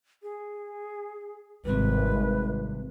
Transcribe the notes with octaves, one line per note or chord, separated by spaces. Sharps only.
G#4
G#1 G2 C3 B4